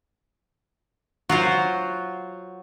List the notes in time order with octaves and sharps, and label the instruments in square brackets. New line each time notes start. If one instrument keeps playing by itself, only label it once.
[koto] F#3 F4 C5 [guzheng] F#4